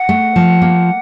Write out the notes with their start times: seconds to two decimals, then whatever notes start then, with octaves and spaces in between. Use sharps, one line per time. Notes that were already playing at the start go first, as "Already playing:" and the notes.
Already playing: F#5
0.09 A3
0.36 F3
0.62 A#3